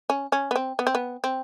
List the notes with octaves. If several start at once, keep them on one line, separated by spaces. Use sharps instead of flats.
C#4
C#4
B3
C4
B3
C4
B3
C4